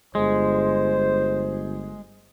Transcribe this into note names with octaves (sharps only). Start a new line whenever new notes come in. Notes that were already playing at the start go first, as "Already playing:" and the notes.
G1 G#3 C5